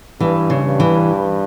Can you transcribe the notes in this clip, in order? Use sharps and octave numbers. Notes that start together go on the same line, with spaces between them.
G2 E3
C#3
G2
E3